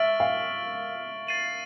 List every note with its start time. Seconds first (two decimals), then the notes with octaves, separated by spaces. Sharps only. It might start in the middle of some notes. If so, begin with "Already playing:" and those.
Already playing: E5 C#6 F6 A6 D7 F#7
0.20 F5
1.27 A6 C7 D#7 F#7